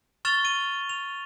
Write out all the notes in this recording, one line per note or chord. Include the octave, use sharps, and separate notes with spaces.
C#6 F6 A6 E7 F7 G7
D#7
F7